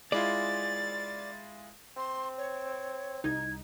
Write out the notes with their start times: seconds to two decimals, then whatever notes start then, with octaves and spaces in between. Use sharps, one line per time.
0.12 G#3 E4 F4 D5 A6
1.97 C4 C6
2.38 C#5
3.24 C2 D#4 G#6